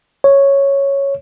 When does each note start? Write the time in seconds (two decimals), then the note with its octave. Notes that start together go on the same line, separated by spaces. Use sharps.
0.24 C#5